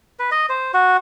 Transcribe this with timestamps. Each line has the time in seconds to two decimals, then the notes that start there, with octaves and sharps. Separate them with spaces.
0.19 B4
0.31 D#5
0.49 C5
0.74 F#4